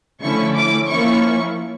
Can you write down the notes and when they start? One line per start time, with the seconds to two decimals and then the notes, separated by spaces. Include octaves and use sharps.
0.21 D3 F3 A3 C#4 E4 C#6
0.55 D6
0.89 F3 A#3 C#4 E4 C#6